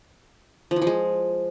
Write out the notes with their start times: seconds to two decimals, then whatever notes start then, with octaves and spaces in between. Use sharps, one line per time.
0.71 F3
0.76 E3
0.82 F3
0.87 G#3